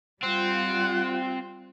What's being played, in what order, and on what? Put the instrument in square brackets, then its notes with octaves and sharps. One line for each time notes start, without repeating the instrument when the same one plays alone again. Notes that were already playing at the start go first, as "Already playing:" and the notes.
[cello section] G3 F4 [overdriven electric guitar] C4 [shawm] F#5